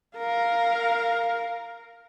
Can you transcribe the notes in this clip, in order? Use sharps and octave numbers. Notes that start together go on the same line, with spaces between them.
A#4 F5